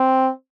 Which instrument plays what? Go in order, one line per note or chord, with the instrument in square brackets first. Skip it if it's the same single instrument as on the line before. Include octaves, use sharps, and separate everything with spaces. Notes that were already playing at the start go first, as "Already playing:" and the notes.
Already playing: [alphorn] C4